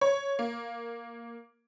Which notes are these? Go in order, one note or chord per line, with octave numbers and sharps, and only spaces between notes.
C#5
A#3